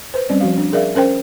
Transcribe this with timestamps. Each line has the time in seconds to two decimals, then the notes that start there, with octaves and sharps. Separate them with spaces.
0.14 B4 C5
0.29 G3 C4 C#4 D5
0.41 F3 F#4 F5
0.58 D4
0.73 G#4 A#4 D5 E5 F5
0.95 C#4 A#4 C5 G5